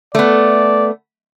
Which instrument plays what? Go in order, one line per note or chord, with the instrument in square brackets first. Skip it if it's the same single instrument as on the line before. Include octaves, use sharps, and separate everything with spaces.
[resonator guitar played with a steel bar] A3 B3 [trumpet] D5